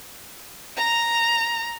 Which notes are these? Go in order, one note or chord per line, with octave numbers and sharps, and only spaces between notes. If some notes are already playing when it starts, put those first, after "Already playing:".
A#5 F7